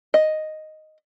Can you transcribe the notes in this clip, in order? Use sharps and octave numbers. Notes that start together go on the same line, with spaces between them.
D#5